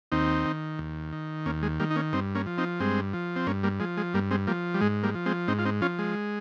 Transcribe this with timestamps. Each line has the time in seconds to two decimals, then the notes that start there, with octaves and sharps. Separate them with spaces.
0.12 D#2 C4 D#4
0.46 D#3
0.79 D#2
1.12 D#3
1.46 D#2 A#3 C#4
1.63 G#3
1.80 D#3 G3 A#3
1.91 D#4
1.96 A#3 C#4
2.13 G2 C4 D#4
2.35 A#3 C#4
2.46 F3
2.58 C4 D#4
2.80 G2 G#3 C4
3.13 F3
3.36 C4
3.46 G2 A#3 C#4
3.63 G3 A#3
3.80 F3 G#3
3.97 G#3
4.14 G2 G3 A#3
4.31 G#3 C4
4.47 F3 G3 A#3
4.74 G3
4.81 G#2 G#3
5.03 G3 A#3
5.15 F3
5.26 G#3 C4
5.48 G#2 C4 D#4
5.59 F4
5.65 C4 D#4
5.81 F3 C#4 F4
5.99 G#3